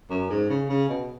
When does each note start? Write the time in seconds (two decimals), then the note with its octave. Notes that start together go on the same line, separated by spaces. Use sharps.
0.10 F#2
0.30 G#2
0.50 C#3
0.69 C#3
0.89 B2